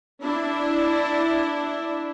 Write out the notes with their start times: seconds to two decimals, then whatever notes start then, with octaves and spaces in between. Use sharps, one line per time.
0.22 D4 E4